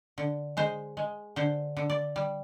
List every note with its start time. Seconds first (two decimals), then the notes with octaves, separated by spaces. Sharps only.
0.18 D3
0.57 G#3 C5
0.97 G#3
1.36 D3 C5
1.77 D3
1.90 D5
2.16 G3